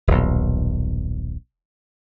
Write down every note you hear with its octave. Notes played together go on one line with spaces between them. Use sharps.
D#1 B1